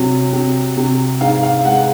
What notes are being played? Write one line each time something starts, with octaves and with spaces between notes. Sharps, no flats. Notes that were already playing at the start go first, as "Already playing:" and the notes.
Already playing: C3 F#3
C3
C3
G#2 F5
F5
G#3 F#5